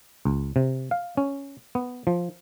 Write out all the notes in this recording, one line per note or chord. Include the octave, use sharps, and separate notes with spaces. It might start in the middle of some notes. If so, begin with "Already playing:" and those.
C#2
C3
F5
C#4
B3
F3